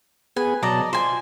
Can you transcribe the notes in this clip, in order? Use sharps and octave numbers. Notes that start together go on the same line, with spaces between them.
B3 G#4 B4 G#5
B2 F#3 D5 D#5 A5 A#5
F4 C5 G#5